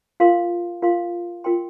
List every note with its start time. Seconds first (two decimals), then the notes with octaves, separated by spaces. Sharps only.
0.20 F4 A#4 F5 C6
0.82 F4 A#4 F5 C6
1.44 F4 A#4 G5 C6